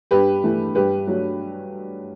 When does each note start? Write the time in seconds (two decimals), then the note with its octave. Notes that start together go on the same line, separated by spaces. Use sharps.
0.11 G2 G4 B4
0.44 E3 A3
0.75 G2 G4 B4
1.08 F#3 A3